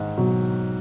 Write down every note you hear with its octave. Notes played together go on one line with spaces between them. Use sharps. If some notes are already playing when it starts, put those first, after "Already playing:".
Already playing: G#2 D#3
B2 F#3